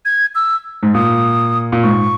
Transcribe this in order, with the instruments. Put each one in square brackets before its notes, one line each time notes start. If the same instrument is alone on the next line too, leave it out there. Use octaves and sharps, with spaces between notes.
[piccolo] G#6
E6
[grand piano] G#2
[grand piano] A#2 [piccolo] D#6
[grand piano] A#2
[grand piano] G#2 [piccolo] C#6